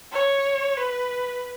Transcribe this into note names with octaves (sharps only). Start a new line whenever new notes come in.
C#5
B4